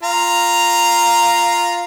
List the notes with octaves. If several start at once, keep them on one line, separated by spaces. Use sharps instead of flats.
F4 A#5